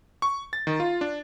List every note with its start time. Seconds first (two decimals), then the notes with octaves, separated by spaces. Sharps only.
0.22 C#6
0.53 A6
0.67 D#3
0.80 F4
1.01 D4